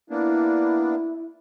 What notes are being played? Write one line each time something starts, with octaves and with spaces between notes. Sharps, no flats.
A#3 B3 D4 E4